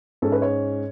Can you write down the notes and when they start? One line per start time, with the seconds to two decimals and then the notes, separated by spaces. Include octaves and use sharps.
0.22 G#2 G#3 C#4 A4
0.32 B4
0.42 C#5